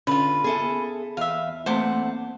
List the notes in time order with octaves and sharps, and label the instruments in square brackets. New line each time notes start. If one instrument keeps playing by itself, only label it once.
[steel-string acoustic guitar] D3 [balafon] C#4 [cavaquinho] F4 B4
[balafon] B3 [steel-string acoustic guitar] G#4 A4 E5
[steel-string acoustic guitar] E2 [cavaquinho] E5 F5
[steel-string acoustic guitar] E2 A3 F#5 [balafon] A#3 C4 [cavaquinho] C5 D6